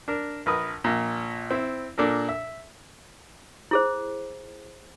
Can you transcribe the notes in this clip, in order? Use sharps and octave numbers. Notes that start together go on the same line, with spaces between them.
D4 A#4
A#1 A#4 B4 D#6
A#1 A#2
C4 E4
A#2 D4 A4 A#4
E5
E4 G#4 C5